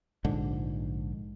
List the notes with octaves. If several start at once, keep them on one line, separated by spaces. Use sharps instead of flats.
A#1 G#2 D3